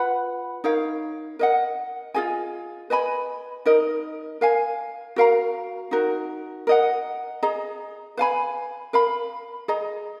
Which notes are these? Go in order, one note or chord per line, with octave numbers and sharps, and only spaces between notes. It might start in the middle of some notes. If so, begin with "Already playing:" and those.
Already playing: F4 B4 F#5 B5
D#4 A#4 C#5 F5
A#4 D#5 F#5
F4 G#4 D#5 G#5
B4 D#5 G#5 B5
D#4 A#4 D#5
A#4 F5 G#5
F#4 A#4 F5 A#5
D#4 F#4 A#4
A#4 D#5 F#5
G#4 D#5 A#5
B4 F5 G#5 B5
A#4 F5 B5
G#4 D#5 A#5